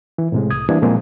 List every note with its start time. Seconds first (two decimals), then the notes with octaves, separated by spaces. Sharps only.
0.18 E3
0.32 A2 C3 G#3
0.50 C2 D#6 G#6
0.69 E3 G3 A#3 D4
0.82 A#2 F3 G#3 A#3 C4 G#4